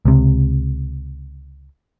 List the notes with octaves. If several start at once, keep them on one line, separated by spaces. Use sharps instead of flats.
C#2 C3